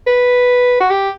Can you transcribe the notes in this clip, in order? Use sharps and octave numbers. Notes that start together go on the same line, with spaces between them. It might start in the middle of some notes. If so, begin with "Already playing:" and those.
B4
F#4
G4